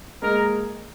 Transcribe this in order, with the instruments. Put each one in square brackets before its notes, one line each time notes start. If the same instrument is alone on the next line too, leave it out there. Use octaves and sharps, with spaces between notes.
[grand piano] G#3 A#3 [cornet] A#4